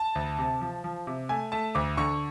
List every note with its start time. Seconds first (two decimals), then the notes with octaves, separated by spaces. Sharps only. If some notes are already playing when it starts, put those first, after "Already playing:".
Already playing: A5
0.15 D2
0.38 C3
0.61 F3
0.84 F3
1.07 C3
1.29 A3 G#5
1.52 A3 A5
1.75 D2 D6
1.97 D3 C#6